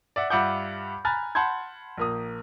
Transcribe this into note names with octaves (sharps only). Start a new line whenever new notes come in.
D5 E5 F#5
G2 F4 E5 F#5 D6 G6
G#5 A#5 B5 F6 F#6 A6
F#5 A5 B5 C6 G6 G#6
A#1 A#3 D#6